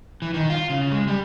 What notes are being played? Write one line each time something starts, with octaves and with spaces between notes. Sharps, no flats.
E3
D#3
F4
C#3
G#3
G3